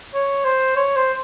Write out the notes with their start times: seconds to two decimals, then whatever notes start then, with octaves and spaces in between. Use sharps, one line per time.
0.14 C#5
0.45 C5
0.76 C#5
0.96 C5